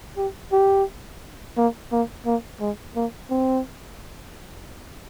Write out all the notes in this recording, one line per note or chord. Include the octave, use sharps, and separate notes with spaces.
G4
G4
A#3
A#3
A#3
G#3
A#3
C4